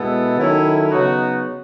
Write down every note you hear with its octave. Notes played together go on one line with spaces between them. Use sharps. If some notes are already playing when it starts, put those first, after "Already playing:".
Already playing: B2 G#3 B3 E4 A4
D#3 F#3 C#4 E4 A4
C#3 F#3 B3 D#4 F#4